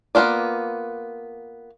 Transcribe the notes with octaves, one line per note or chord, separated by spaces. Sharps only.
A#3 B3 D4 F4 D5